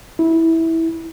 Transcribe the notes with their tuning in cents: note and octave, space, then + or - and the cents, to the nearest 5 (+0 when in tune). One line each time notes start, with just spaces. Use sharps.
E4 -15